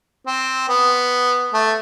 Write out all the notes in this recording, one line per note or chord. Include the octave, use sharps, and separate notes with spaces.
C4
B3
A3